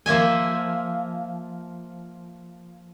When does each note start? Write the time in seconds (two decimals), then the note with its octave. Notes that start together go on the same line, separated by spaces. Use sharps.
0.06 F3 A#3 E5 G#5